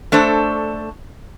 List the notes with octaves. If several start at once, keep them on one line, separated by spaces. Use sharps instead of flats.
A3 D4 A4 C5